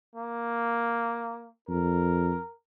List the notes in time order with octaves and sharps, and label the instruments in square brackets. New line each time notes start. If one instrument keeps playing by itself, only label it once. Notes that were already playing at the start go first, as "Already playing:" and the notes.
[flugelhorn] A#3
[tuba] F2 [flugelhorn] A#4